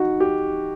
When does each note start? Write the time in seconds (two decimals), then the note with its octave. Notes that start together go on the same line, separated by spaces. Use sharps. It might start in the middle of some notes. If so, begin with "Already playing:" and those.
Already playing: D#4 F#4
0.20 G4